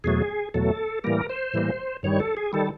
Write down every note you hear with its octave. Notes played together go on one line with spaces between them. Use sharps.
E2 B2 F#3 A3 G#4
E2 B2 F#3 A3 A4
A2 E3 G3 A#3 A#4
C5
A2 E3 G3 A#3
G2 D#3 G3 C#5
A4
G#4
D#3 G3 A4